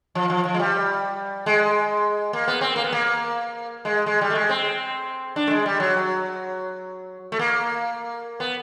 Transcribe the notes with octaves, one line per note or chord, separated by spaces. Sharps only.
F3
F3
F3
G#3
G3
G#3
A#3
B3
C4
A#3
B3
A#3
G#3
G#3
G3
A3
G#3
C4
D4
A3
G#3
G3
F#3
A3
A#3
B3